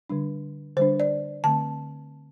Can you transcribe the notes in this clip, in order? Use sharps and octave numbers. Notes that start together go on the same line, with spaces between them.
D3 G3 D4
D3 G3 D4 C5
D5
D3 A3 C4 A5